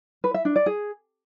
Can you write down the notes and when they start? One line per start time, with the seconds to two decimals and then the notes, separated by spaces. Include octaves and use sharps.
0.24 B4
0.34 E5
0.45 D4
0.56 D5
0.66 G#4